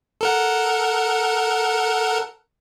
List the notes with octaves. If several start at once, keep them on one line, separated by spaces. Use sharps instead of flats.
A4 A#4 F#5